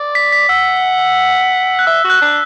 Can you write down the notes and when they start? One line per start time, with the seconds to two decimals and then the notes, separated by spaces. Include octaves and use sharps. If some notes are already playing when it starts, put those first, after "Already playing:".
Already playing: D5
0.15 B6
0.32 B6
0.49 F#5 E6
1.79 F#6
1.87 E5 E6
2.04 F#4
2.10 F#6
2.21 D4